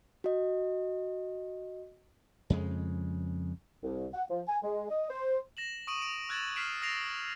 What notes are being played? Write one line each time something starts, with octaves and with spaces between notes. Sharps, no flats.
F#4 D#5
F2 C#3 G#3
C2
F#5
F3
G#5
G#3
D#5
C5
A#6 E7 F#7
C#6 D#6 D7 D#7 F#7
D7 F7
E6 F#6 G#6 A6 E7 F#7
F6 F#6 B6 C7 D7 E7
E6 A6 A#6 C7 D7 F7